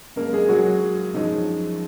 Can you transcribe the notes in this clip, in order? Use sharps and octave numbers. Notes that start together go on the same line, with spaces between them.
F#2 C#3 G#3 A#3 A#4
G#3 G#4
F#3 F#4
F#2 F3 G#3 D#4